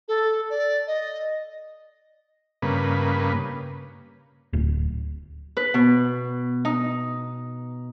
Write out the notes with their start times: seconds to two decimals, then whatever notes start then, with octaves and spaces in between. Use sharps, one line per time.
0.08 A4
0.50 D5
0.87 D#5
2.62 G2 C#3 A#3 B4
4.53 D1
5.57 B4
5.74 B2
6.65 D#4